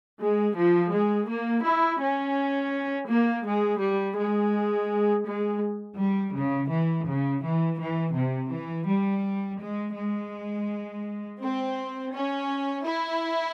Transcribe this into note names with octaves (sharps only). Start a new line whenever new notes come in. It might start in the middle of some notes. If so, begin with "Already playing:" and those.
G#3
F3
G#3
A#3
E4
C#4
A#3
G#3
G3
G#3
G#3
G3
C#3
E3
C#3
E3
E3
C3
E3
G3
G#3
G#3
C4
C#4
E4